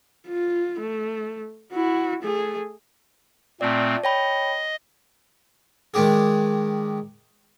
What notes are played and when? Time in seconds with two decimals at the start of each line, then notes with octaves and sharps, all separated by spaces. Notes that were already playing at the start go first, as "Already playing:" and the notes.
0.28 F4
0.80 A3
1.72 E4 F#4
2.22 A3 G#4
3.61 A#2 A3 C4 D5 A5
4.04 C#5 D#5 G5 B5
5.94 D#3 G#3 D4 G4 G#4